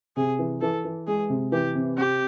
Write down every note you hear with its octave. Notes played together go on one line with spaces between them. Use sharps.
C3 G#4
E3
E3 A4
E3
G#3 G#4
C3
E3 G4
C3
C4 G4